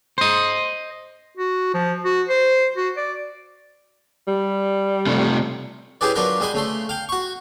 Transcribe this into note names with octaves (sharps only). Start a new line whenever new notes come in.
C5 D#5
F#4
F3
F#4
C5
F#4
D5
G3
C3 A3
C#4 E4 G4 G#4 B4 D5
F#3 D4 F4 A#4 B4
G3 G#3 D#5 G#5 B5
C#3 A3 C6
F5 G5
F#4 C#6